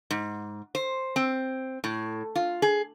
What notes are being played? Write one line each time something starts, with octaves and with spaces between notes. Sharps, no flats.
G#2
C5
C4
A2
F4
G#4